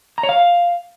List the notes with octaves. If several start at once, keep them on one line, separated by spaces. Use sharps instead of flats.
A#5
C#5
F5